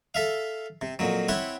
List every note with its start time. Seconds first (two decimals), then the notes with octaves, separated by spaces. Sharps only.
0.14 A4 E5 F5
0.82 C3
0.99 F2 A#2 F#3
1.29 C4 E4 C#5 F#5